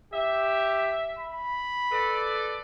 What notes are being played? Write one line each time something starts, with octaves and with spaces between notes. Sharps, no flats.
G4 E5
B5
A4 B4 D5